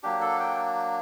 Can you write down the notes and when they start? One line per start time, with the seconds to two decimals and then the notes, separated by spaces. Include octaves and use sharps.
0.03 F#3 A#3 D4 G4
0.21 A4
0.40 G5